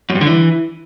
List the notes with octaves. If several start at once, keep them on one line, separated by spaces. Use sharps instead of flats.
F#2
G2
D3
E3